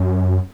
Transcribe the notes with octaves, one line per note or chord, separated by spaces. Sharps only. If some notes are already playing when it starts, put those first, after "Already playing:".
Already playing: F#2